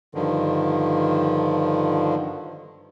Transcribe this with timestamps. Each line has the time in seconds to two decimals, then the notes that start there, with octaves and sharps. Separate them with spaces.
0.15 G2 D3 D#3 F3